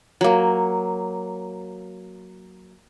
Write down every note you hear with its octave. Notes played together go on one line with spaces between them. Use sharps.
F#3 A#3